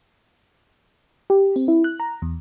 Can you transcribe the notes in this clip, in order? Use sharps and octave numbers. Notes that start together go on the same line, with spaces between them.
G4
C4
E4
F#6
A#5
E2